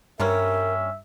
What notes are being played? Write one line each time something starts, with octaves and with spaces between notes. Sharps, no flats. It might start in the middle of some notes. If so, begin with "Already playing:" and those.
G2 G3 A#3 C#4 A#4 E5